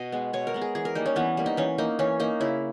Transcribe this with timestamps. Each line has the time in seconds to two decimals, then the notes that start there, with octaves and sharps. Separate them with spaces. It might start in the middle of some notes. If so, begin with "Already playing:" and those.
Already playing: B2 D#5
0.12 G#3 B3
0.33 B2 C#5
0.47 A#4
0.54 G#3 B3
0.61 G#4
0.75 E3 G#4
0.85 A#4
0.95 G3 A#3 D#4
1.06 C#4
1.16 E3 B3
1.37 G3 A#3
1.46 D#4
1.57 E3 C#4
1.78 A#3 D#4
1.99 E3 C#4
2.20 A#3 D#4
2.40 C#3 E4